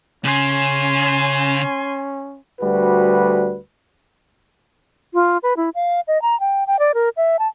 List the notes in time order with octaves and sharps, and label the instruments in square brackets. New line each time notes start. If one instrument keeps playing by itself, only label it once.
[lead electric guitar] C#3 [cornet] C#4 [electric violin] G#5 C6
[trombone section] D2 G3 F#4 B4
[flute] F4
B4
E4
F5
D#5
A#5
G5
G5
D5
A#4
E5
A5